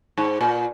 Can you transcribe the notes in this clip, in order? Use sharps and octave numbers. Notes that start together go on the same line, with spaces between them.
G#2
A#2